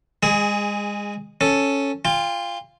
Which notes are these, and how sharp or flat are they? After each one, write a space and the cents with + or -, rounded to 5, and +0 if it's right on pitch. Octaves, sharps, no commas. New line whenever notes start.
G#3 -25 G#4 -5 D#6 +25
C#4 +0 A4 +0
F4 -5 G5 +40